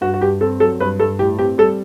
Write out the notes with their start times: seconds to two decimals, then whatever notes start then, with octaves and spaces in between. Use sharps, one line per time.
0.01 G2 F#4
0.14 F#4
0.21 G2 G4
0.41 C4 A4
0.60 F#3 A4
0.80 G2 B4
0.99 G2 A4
1.19 A2 G4
1.38 C4 G4
1.58 G3 A4